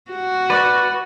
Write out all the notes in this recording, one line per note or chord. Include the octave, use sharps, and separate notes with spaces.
F#4
B4 D5